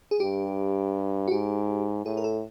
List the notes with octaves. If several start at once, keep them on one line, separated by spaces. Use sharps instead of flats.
G#4
G2 G4
F#4
G#2 G4
A2 G#4
A#4
A4